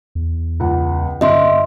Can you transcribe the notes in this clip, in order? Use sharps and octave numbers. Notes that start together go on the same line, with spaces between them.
E2
C#2 F#5
G1 D#5 E5 C6